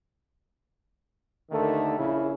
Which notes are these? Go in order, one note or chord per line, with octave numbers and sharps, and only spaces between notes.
D#2 D3 D#3 A3
A#1 C#3 E4